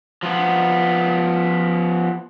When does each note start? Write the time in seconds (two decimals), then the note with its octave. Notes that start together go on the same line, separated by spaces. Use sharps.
0.23 F3 B3